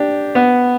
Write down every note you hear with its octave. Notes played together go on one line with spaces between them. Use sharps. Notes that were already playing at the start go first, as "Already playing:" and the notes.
Already playing: D4 G4
B3